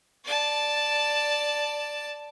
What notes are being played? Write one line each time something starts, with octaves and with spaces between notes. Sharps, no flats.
D5 A5